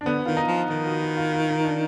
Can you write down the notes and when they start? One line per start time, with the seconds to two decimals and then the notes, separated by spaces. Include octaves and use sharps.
0.01 D4
0.05 D3 B3
0.26 D#3 F4
0.37 D#4
0.47 F3
0.69 D#3 F4
0.85 F#4
1.01 F#4
1.17 F4
1.33 F4
1.49 D#4
1.65 D4